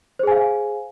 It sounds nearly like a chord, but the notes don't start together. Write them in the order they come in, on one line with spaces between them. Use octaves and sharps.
C5 G#4 G#5 F5